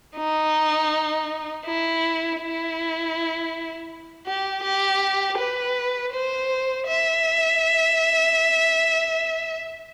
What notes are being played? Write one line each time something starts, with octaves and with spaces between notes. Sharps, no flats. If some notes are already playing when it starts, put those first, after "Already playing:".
D#4
E4
E4
G4
G4
B4
C5
E5